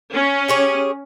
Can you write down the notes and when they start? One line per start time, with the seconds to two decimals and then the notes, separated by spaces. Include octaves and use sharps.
0.14 C#4
0.48 G4 G#4 C#5